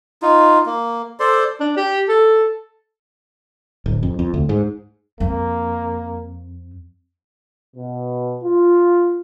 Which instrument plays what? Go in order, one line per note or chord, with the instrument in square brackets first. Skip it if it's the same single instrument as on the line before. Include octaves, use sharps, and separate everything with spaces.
[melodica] D#4 F4
A#3
A4 C5 D5 C6
[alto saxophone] D4
G4
A4
[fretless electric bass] D1
F2
F2
D2
G#2
[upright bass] F2 [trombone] A#3
[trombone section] B2
F4